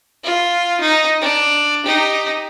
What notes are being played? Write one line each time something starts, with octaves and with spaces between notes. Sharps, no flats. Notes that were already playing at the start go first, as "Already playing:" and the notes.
F4
D#4
D4
D#4 G4